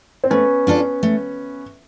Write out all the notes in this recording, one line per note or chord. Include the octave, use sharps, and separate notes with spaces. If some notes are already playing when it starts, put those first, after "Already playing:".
C4
A3 B3 C#4
D4 F4 A4 D5
A3